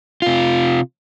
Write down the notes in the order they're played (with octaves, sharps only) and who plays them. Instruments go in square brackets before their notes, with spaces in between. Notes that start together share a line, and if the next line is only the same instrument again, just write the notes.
[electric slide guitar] C3 F4